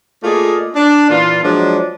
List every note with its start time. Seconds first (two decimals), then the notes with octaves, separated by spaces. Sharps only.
0.24 A3 A#3 F4 G#4 D5 D#5
0.75 D4
1.10 A#2 E3 F4
1.43 F3 F#3 G#3 D4